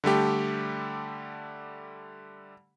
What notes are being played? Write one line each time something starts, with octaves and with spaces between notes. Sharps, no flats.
D3 G3 A3 G4